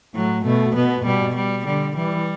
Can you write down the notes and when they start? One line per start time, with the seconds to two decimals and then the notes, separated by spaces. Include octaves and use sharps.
0.14 A2 F#3
0.45 B2 A3
0.75 B2 B3
1.05 B2 G3
1.35 G3
1.66 D3 G3
1.96 E3 G3